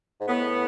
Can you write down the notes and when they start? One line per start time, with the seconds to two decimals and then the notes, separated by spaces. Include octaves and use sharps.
0.20 G#2
0.28 A2 B3